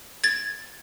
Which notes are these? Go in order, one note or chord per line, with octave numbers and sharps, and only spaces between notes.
G#6 A6